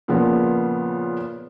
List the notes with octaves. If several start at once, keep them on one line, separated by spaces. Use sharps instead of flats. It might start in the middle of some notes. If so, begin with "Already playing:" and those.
A#2 C#3 F3 B3